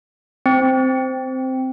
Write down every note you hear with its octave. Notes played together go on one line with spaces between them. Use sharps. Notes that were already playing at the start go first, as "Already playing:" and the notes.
C4